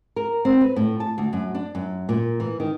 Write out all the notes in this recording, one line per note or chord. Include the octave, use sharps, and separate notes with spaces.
A#4
C4
B4
A2
A5
D2
F#2
D4
F#2
A#2
E3
D#3